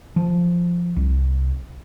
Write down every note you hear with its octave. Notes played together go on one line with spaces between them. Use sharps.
F3
C2